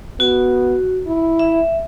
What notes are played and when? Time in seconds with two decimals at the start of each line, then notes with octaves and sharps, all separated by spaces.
0.20 B3 F#4
1.07 E4
1.39 E5